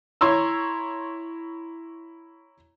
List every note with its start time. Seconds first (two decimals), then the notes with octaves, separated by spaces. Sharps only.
0.21 E4 C#5 A#5 C6 E6